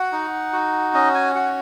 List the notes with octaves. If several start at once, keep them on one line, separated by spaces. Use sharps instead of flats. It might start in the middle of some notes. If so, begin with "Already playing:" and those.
Already playing: F#4 F#5
D#4
F#4
C#4 D#5
G#5
F#4 F#5